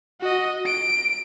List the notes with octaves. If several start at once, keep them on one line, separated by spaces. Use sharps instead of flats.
F#4 D#5
D7